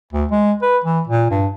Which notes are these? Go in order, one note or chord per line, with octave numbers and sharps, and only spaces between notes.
D2
G#3
B4
E3
A#2
G2